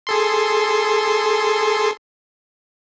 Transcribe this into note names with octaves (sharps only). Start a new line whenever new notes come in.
G#4 A4 C6